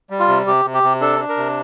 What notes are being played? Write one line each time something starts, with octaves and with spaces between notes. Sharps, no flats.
G3
F4
C3
C3 G4
C3
G4
C3
D4 A4
D4
A#4
C3